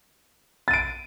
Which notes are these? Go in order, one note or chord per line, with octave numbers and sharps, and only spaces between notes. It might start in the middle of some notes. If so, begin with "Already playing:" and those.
A6 D7 D#7